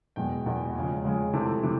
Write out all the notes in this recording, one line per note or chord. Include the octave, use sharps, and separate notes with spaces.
E2 B2 G#3 G5
E2 B2 G#3
C#3 F3 G#3
C#3 F3 G#3
C3 E3 A3 C4 A5
C3 E3